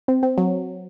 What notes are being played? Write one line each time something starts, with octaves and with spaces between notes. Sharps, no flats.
C4
C4
F#3